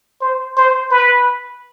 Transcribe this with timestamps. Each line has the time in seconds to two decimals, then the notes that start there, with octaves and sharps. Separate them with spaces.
0.21 C5
0.57 C5
0.91 B4